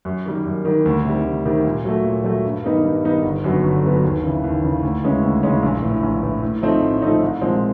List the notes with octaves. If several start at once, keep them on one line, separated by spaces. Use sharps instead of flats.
F#2
D#3 G3 A#3
F#2
D#3 G3 A#3
D2
C3 D#3 G3
D2
C3 D#3 G3
A#2
F#3 A3
A#2
F#3 A3
G2
D#3 G3 B3 D#4
G2
D#3 G3 B3 D#4
G1
F#2 D3 F#3 B3
G1
F#2 D3 F#3 B3
D#2
C#3 E3
D#2
C#3 E3
D2
C#3 E3 G#3 C#4
D2
C#3 E3 G#3 C#4
A#1
A2 E3
A#1
A2 E3
A2
F3 A3 C4 D#4
A2
F3 A3 C4 D#4
C2
A#2 F3 G#3 C4